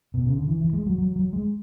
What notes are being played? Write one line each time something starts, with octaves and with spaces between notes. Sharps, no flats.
B2
C#3
D3
E3
E3
G#3
F#3
F#3
F#3
G#3